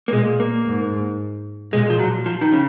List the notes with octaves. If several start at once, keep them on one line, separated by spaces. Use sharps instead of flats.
A#3
A#2 G#3
A#3
G#2
A#2 G#3
F3
F#3
F3
D#3
C#3